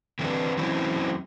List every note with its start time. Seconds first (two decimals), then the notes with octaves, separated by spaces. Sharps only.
0.19 D3 E3 C4 D4 B4
0.57 E3 F#3 C4 C#4 E4